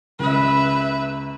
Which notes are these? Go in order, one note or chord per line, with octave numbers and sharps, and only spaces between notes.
C#2 B4 E5